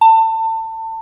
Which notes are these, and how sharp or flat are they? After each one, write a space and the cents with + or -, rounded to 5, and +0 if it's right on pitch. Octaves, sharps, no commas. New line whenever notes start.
A5 +30